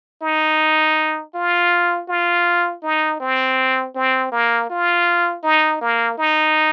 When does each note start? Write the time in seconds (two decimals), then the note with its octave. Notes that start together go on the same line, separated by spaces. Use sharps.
0.22 D#4
1.35 F4
2.08 F4
2.83 D#4
3.20 C4
3.95 C4
4.32 A#3
4.70 F4
5.43 D#4
5.81 A#3
6.18 D#4